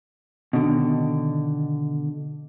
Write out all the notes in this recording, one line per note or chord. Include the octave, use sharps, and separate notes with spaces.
B2 D3 D#3